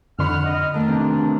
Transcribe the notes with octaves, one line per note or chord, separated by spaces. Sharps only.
F2 D3 F#5 B5 F6
D#5
D#3 A3 D4
C3 E3 C4 D4